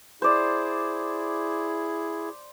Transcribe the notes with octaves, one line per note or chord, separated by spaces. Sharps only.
E4 G#4 C5 D5